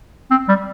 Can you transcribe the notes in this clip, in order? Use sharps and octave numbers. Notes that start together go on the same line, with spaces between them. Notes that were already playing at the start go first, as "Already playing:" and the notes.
C4
G3